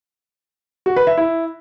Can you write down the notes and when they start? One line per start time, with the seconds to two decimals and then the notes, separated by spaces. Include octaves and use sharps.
0.86 F#4
0.96 B4
1.07 E5
1.17 E4